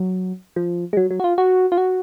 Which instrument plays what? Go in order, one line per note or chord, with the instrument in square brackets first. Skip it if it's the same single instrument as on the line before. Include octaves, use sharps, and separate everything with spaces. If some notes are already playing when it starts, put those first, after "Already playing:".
Already playing: [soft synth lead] F#3
F3
G#3
F#3
F#3
F#4
F4
F#4
F4
F#4